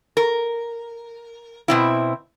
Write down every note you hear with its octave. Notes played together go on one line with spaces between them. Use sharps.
A#4
B2 C4 E4